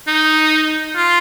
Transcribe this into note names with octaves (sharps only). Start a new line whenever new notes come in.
D#4
F4